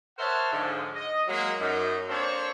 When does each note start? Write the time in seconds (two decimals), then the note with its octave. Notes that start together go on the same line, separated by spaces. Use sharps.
0.18 A#4 C5 C#5 E5 F#5 A5
0.51 G#2 D3 F3
0.94 D#5
1.28 F#3 G#3 A#3
1.60 F#2 D#4
2.08 A#3 C4 D4 A4 C5 C#5